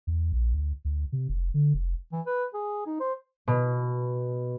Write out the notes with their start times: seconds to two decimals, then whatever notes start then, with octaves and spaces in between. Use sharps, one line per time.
0.07 E2
0.32 A#1
0.54 D2
0.85 D2
1.12 C3
1.29 F1
1.54 D3
1.74 F1
2.12 E3
2.26 B4
2.54 G#4
2.86 D#4
3.00 C5
3.48 B2